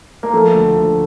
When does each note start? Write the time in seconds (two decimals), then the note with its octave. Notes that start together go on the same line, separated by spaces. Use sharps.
0.23 A#3
0.33 F3 A3
0.54 D2
0.77 D2